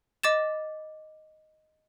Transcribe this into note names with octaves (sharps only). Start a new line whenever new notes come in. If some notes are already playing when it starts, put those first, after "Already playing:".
D#5 D6 A6 E7